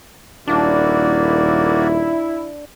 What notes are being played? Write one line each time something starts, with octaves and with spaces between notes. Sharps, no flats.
D#1 A#3 D4 E4 F#4 D5